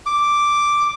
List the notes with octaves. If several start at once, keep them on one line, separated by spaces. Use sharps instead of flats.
D6